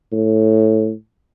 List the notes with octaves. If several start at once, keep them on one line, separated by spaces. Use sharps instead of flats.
A2